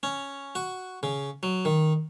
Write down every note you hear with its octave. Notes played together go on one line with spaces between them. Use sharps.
C#4
F#4
C#3
F#3
D#3